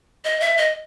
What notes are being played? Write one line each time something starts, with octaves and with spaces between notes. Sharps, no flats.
D#5
E5
D#5